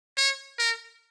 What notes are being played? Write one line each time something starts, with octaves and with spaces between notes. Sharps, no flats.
C#5
A#4